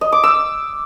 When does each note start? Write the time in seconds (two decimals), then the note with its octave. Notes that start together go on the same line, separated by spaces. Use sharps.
0.01 D#5
0.12 D6
0.23 E6